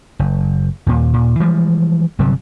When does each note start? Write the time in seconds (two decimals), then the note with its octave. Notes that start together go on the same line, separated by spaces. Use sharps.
0.19 F#1
0.87 D#2 A#2
1.13 D#2 A#2
1.40 E3 F3 G3 G#3
2.19 G1 C3 F#3 G3